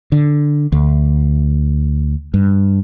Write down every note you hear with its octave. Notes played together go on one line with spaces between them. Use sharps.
D3
D2
G2